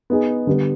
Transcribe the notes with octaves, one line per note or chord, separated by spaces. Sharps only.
B3 D#4 G#4
D3 G3 B3